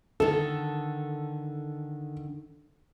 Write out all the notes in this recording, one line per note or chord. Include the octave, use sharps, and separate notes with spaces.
D3 D#3 A4